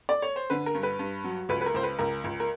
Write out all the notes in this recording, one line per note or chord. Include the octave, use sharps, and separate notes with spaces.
D5
C#5
C5
D3 B4
A#4
G2
B4
G2
F#3
C#2 B4
B4
A#4
C#2 C5
B4
C#2 A#4
C#2
A#4